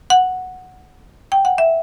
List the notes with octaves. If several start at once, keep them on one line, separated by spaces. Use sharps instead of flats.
F#5
G5
F#5
E5